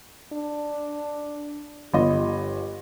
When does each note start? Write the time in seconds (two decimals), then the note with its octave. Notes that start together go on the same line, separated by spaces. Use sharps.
0.33 D4
1.94 G1 G4 D#5